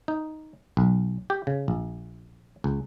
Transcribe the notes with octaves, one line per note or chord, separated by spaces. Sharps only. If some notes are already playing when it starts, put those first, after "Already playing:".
D#4
B1
G4
C#3
A#1
C#2